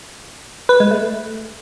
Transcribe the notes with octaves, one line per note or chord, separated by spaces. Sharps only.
B4
G#3
A3